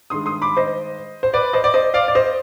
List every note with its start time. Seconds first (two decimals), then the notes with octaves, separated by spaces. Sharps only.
0.10 G2 D#3 G#3 C6 D#6
0.26 C6 D#6
0.42 B5 D6
0.57 C5 D#5
1.23 C5
1.33 B4 D5
1.53 C5 D#5
1.64 D5
1.74 C5 D#5
1.94 D5 F5
2.08 D5
2.15 C5 D#5